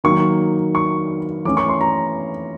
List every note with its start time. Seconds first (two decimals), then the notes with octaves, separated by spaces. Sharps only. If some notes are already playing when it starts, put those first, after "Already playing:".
0.04 D#3 F#3 A#3 D#4 C#6
0.75 C#6
1.45 E3 A3 C#4 D6
1.57 C#6
1.68 C6
1.81 A#5